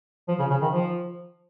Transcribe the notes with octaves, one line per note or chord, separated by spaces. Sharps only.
F3
C#3
C#3
D#3
F3